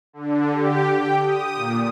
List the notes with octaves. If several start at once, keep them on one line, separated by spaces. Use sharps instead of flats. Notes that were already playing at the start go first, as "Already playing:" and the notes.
D3
G4
G5
D#6
A#2